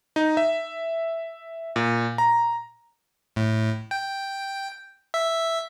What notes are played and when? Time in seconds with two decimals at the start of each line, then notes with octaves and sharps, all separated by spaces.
0.16 D#4
0.37 E5
1.76 A#2
2.18 A#5
3.36 A2
3.91 G5
5.14 E5